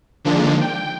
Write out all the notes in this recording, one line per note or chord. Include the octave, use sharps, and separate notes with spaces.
D3 D#3 F3 G#3 A#3 D4
G5